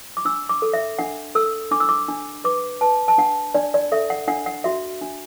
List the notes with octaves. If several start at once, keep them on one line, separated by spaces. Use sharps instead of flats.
D6
D4 E6
D6
A4
E5
D4 F#5
A4 E6
D4 D6
E6
D6
D4
B4 D6
B4 A5
A5
D4 F#5
D4 D5
D5
A4 E5
F#5
D4 F#5
F#5
F#4 E5
D4